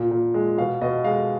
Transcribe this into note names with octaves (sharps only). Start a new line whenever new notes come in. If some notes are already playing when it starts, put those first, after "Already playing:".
Already playing: A#2
A#2
G#3
B2 F5
B2 D#5
G#3 F5